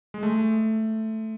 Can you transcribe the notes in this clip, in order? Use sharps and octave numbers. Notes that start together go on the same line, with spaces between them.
G#3
A3